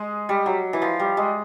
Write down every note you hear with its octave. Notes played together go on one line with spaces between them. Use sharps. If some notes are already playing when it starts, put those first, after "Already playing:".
Already playing: G#3
G3
F#3
E3
F3
G3
G#3